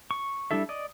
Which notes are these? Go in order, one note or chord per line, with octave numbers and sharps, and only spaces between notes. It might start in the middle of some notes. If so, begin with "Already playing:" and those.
C#6
G3 D4 E4 A4 E5
D5 D#5